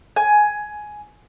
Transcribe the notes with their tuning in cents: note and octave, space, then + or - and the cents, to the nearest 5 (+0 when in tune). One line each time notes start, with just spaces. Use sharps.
G#5 +10